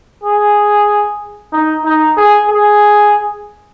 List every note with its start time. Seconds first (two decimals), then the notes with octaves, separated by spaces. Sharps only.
0.23 G#4
1.52 D#4
1.85 D#4
2.17 G#4
2.49 G#4